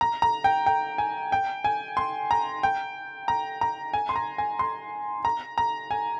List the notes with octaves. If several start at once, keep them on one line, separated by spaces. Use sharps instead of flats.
A#5
A#5
G5
G5
G#5
G5
G#5
C6
A#5
G5
A#5
A#5
G#5
C6
A#5
G#5
C6
A#5
A#5
G#5